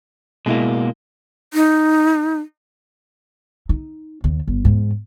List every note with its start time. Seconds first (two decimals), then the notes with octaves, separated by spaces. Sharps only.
0.46 B2 G#3 A#3 E4
1.54 D#4
3.69 D#4
4.24 D#2 D#3
4.47 G1
4.65 E2 G#2